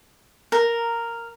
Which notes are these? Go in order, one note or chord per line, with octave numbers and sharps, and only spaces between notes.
A#4